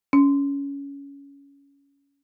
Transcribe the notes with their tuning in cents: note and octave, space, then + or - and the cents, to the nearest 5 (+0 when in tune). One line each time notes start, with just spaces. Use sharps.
C#4 +15